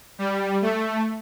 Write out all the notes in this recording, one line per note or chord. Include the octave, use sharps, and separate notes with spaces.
G3
A3